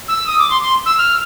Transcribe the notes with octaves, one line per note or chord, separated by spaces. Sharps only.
E6
D#6
D6
C6
C6
E6
F6